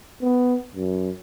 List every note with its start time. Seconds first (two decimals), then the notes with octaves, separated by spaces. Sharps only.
0.22 B3
0.75 F#2